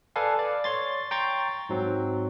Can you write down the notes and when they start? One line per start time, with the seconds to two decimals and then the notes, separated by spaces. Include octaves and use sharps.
0.16 A4 B4 D5 F5 G#5
0.39 D5
0.64 C#5 C6 A6
1.11 G5 A#5 C6 C#6 A6
1.69 G#2 F#3 C4